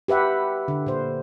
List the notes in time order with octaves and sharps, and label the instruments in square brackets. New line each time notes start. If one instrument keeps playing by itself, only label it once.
[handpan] G4 B4 E5 F#5
D3
A#2 C5